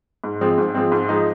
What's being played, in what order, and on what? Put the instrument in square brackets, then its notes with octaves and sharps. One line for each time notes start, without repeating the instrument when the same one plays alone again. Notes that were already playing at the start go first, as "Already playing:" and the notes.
[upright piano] G#2
F3 G#3 C4
G#2
F3 G#3 C4
G#2
F3 G#3 D#4